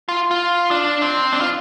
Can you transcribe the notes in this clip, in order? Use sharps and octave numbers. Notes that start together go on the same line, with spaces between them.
F4
F4
D4
C4
D4
F4